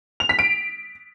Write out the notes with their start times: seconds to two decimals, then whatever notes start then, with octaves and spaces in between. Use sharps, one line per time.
0.20 F7
0.29 B6
0.39 D7